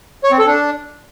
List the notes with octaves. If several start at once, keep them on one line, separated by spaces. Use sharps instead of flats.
C#5
C4
A4
D4